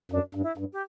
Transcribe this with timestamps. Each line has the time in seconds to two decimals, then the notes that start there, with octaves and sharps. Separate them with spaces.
0.12 F#2 D4
0.35 G2
0.43 E4
0.58 G2
0.73 G4